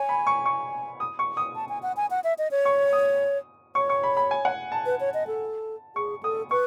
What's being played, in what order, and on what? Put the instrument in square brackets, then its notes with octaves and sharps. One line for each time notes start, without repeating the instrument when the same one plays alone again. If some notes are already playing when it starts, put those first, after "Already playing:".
Already playing: [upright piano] C#5 [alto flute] G#5
[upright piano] B5
C#6
C#6
D#6
C#6
D#6
[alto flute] A5
G#5
F#5
G#5
F#5
E5
D#5
C#5
[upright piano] C#6
D#6
[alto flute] C#5 [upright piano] C#6
[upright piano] C#6
B5
B5
G#5
F#5
A5
[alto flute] B4
C#5
D#5
A4
[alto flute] G#4 [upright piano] C#6
[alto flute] A4 [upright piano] D#6
[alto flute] B4 [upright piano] C#6